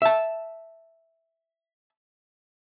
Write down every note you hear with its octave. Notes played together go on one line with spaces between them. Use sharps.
E5 A5